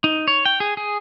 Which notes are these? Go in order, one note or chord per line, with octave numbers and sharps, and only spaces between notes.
D#4
C#5
G5
G#4
G#4